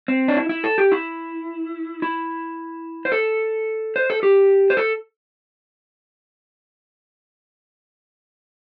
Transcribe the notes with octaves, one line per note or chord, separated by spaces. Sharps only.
C4
D4
E4
E4
A4
G4
E4
E4
C5
A4
C5
A4
G4
C5
A4